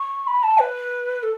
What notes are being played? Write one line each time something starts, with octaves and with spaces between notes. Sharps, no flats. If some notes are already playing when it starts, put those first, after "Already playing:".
Already playing: C#6
B5
A5
B4
A4